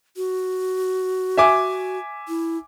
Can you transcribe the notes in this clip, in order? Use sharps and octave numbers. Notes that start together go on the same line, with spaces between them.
F#4
E5 G#5 D6
E4